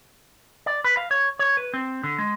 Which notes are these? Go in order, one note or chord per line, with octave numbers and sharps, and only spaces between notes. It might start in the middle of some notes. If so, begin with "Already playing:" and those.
D5
B4
F5
C#5
C#5
B4
C4
D3
G#3